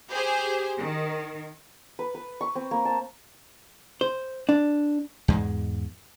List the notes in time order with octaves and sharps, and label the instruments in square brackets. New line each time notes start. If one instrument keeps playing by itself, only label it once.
[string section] G4 G#4 C5
D#3
[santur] B4
B4
C#6
C4
A#3
A5
[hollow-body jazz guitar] C5
D4
[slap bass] E2 G#2 G#3